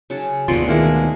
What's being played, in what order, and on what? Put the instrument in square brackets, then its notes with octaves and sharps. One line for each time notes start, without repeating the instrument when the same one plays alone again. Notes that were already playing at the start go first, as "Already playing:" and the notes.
[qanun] C#3 F#3 A5
[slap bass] D2 B2 [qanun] G3 D4 G#4 [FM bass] F4
[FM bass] D#3 [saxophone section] G#3 A#3 E4